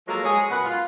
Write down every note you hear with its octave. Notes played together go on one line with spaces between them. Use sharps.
F3 F#3 G#3 A#3 A4 A#4
G#3 G#4 C#5
F#2 B2 B4 F#5
F4